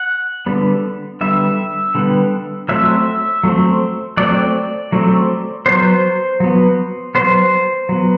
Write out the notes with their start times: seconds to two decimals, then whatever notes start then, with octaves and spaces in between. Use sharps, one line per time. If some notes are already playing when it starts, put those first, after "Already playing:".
Already playing: F#5
0.46 D3 G3 B3
1.21 D3 G3 B3 E5
1.95 D3 G3 B3
2.69 F#3 A3 C4 E5
3.43 F#3 A3 C4
4.17 F#3 A3 C4 D5
4.92 F#3 A3 C4
5.66 F#3 B3 C5
6.40 F#3 B3
7.15 F#3 B3 C5
7.89 F#3 B3